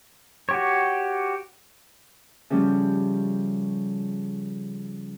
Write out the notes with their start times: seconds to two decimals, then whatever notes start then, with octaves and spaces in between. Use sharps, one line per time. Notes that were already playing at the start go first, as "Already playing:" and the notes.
0.49 F#4 G4 C#5
2.50 C#3 F3 G3 A3 C#4